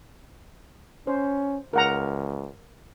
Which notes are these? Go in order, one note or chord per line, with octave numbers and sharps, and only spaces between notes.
C#4 C5
C#2 A#4 F#5 A#5